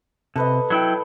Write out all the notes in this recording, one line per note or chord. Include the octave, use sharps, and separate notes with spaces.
C3 A4 B4 D#5
F#3 E4 G5